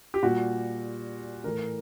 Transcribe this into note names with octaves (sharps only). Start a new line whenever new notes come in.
G4
A#2 G3 F#4
A2 E3 A3 A#4